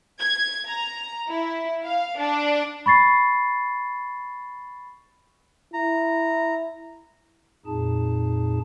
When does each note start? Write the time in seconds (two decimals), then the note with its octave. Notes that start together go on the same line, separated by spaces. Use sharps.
0.21 G#6
0.67 A#5
1.29 E4
1.85 F5
2.20 D4
2.86 B5 C#6 A6 C7
5.74 E4 A#5
7.66 F2 A#2 D#4 G#4 A5